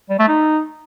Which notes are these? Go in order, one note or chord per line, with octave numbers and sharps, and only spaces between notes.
G3
A3
D#4